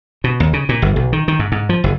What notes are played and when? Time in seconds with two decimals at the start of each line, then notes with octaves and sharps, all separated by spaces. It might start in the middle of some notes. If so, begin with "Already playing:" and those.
0.24 B2
0.40 D#2
0.53 C#3
0.69 A#2
0.82 G1
0.96 B1
1.13 D#3
1.28 D#3
1.39 G#2
1.52 G#2
1.69 F3
1.84 F#1